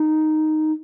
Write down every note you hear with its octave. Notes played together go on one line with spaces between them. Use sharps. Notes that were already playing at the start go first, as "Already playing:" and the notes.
Already playing: D#4